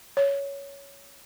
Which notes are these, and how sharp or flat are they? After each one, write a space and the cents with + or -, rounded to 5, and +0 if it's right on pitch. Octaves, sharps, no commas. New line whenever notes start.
C#5 +10